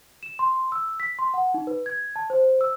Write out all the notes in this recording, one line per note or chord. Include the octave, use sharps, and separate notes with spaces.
E7
C6
E6
B6
C6
F#5
D#4
B4
G#6
A5
C5
E6